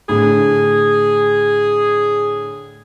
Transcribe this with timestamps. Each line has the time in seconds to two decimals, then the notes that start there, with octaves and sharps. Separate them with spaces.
0.09 A2 D3 D4 G#4